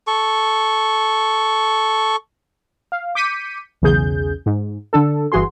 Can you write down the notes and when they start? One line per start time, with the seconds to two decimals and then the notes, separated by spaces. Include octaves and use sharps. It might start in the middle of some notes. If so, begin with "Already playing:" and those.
0.07 A4 C#6
2.92 F5
3.15 D6 G6 B6 C#7 D#7
3.82 B1 E2 C#3 G#4 G6
4.46 G#2
4.93 D3 D4 A4
5.32 G1 E3 F#4 G#4 C6